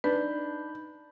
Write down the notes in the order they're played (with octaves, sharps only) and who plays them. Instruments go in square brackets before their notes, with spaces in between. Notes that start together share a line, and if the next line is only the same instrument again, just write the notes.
[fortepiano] D4 [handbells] D#4 B5 G6 [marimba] B4